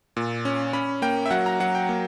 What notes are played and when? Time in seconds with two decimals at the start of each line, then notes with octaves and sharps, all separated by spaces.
0.17 A#2
0.45 C#4
0.73 C#4 B5
1.02 A#3 G5
1.26 E5
1.31 F#3 F#5
1.46 A#5
1.60 F#3 F#5
1.75 G5
1.89 A#3